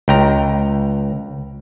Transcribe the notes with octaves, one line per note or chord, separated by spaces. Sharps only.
C#2 G5 A#5